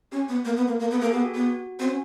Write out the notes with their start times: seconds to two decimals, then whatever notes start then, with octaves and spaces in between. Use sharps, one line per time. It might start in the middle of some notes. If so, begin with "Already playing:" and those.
0.12 C#4 G4
0.28 B3
0.45 A#3
0.57 B3
0.68 A#3
0.80 A#3
0.91 B3 A4
1.01 A#3 G#4
1.12 B3 G4
1.24 F#4
1.35 B3 F#4
1.46 F#4
1.79 C4 F#4
1.89 C#4